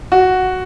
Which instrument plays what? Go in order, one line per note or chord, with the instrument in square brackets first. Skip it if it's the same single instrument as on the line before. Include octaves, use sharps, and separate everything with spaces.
[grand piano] F#4